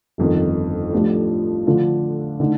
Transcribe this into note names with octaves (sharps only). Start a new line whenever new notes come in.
G1 F2 D#3
A2 F3 A3 D4 G4
D3 F3 A3 D4 F4
D3 A3 D#4